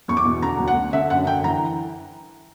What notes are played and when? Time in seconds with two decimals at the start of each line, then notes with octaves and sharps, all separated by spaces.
0.08 E2 C#6
0.17 D6
0.25 B2
0.42 D3 A#5
0.59 D2
0.68 F#5
0.76 D3
0.93 D3 E5
1.10 F#2 F#5
1.27 D3 G5
1.44 E3 A#5